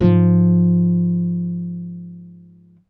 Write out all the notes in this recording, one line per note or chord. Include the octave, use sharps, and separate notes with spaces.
G#2 F3